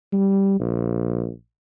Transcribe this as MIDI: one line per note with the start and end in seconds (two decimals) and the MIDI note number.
0.13 0.59 55
0.60 1.30 34